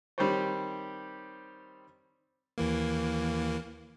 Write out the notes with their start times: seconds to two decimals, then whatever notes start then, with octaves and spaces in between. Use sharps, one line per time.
0.18 D#3 G3 C4 G4 C5 C#5
2.58 D#2 E3 A#3